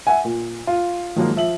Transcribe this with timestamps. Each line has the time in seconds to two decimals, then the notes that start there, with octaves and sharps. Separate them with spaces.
0.07 E5 F#5 G#5
0.25 A#2
0.67 F4
1.16 D#3 F3 F#3 G#3 A#3
1.36 F3 E5 F#7